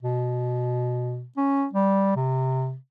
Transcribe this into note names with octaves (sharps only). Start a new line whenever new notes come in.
B2
C#4
G3
C3